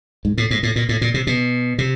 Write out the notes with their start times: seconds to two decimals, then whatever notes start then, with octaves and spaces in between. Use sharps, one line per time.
0.25 G#2
0.38 A2
0.51 G#2
0.63 A2
0.76 A#2
0.89 A2
1.01 A#2
1.14 C3
1.27 B2
1.78 C3